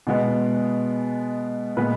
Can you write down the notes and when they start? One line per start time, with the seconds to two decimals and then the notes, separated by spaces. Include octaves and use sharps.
0.07 B2 G#3 B3
1.77 A#2 G#3 B3 B4